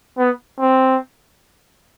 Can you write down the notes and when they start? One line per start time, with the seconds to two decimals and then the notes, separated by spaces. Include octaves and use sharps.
0.18 B3
0.60 C4